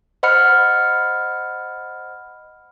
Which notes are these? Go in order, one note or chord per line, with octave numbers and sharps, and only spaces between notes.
C5 D#5 F#5 B5 F6 C#7